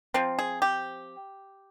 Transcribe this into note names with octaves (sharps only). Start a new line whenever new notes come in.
F3 C4 F4
G#4
G4